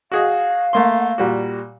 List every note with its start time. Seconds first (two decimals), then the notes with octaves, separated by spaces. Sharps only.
0.12 F#4 G#4 D#5 F5
0.73 A3 A#3 C6
1.18 A#2 G3 F#4